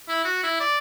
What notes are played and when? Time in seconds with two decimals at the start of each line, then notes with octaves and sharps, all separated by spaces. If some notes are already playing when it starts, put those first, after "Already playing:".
0.08 E4
0.25 F#4
0.43 E4
0.60 D5